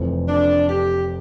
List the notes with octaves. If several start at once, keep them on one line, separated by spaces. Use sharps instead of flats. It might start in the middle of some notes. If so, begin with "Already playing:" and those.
Already playing: F1 F2 E3
D4
G4